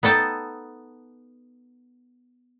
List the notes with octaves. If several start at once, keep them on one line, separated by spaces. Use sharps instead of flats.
B3 D#4 A4 G5 A5